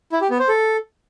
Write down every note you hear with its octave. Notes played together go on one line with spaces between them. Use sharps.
E4
G4
B3
C5
A4